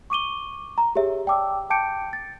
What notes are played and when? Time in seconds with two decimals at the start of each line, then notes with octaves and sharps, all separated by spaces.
0.10 C#6 D6 D#7 G7
0.78 A#5
0.95 G4 G#4 C#5 E5
1.26 D5 G5 A5 D6 E6
1.70 G5 A5 D6 G6 C#7 D7
2.13 A6